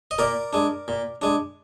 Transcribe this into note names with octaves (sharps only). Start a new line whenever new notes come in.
D#5
A#2 A#4 D5
G#3 D4
A#2
G#3 D4